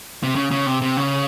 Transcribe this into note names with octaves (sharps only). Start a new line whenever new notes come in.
C3
C#3
C#3
C3
C3
C#3